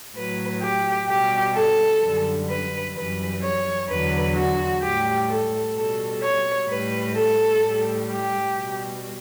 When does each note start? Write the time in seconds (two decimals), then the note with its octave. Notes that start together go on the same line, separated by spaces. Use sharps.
0.15 A2 F#3 B4
0.61 G4
1.08 B2 G3 G4
1.54 A4
2.01 F#2 D3 G3
2.48 B4
2.95 F#2 E3 G3 B4
3.41 C#5
3.88 E2 D3 F#3 B4
4.35 F#4
4.81 A2 G3 G4
5.28 A4
5.74 B2 G3 A4
6.22 C#5
6.68 A2 G3 B4
7.15 A4
7.61 A2 G3
8.09 G4
8.55 B2 G3